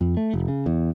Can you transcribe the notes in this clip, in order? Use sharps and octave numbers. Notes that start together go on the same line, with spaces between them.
F2
A3
F1
C#3
E2